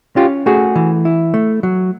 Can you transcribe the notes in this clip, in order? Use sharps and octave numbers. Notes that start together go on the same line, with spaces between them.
C#4 F4 G4
A3 F#4 G#4
E3
E4
A3
F#3